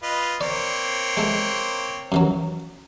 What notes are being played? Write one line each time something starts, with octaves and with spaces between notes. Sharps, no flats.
F4 B4 D#5
A#3 C4 C#5 D5
G#3 A3
F#2 E3 F#3